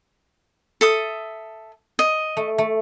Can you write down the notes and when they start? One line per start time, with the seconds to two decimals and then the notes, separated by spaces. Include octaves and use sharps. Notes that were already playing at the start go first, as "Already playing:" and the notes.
0.81 A4 E5 D#6
1.99 D#5
2.37 A3
2.58 A3